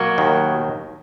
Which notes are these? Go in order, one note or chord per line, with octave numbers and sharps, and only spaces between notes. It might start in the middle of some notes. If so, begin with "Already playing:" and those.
Already playing: B2 F#3 A#3
D#2 D#3